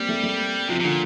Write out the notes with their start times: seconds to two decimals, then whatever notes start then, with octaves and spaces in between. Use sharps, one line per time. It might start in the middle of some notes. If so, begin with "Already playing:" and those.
Already playing: G3 A#3 C4
0.09 A3
0.23 A3
0.69 C3 F3
0.80 C3
0.84 A#2 D3